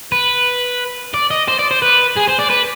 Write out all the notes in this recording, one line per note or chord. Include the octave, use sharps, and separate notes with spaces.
B4
D5
D#5
C5
D5
C5
B4
G#4
C5
D5
B4